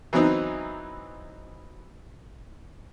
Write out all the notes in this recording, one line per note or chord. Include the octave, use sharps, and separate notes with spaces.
E3 F#3 B3 C4 D#4